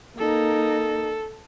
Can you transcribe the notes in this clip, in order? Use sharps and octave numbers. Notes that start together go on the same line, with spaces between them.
A#3 D#4 A4